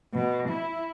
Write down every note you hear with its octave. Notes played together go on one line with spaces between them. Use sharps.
B2
E4